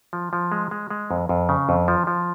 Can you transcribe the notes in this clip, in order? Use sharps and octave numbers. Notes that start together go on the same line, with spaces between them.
F3
F3
G#3
G#3
G#3
F2
F2
C#3
F2
F3
F3